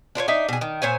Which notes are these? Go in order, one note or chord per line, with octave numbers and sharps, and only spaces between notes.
D4 F4 C5 C#5
D4 D#4 E5
B2 G#4
D#3
A#2 C5 C#5 G#5